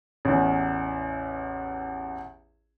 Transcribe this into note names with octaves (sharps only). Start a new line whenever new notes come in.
A1 E2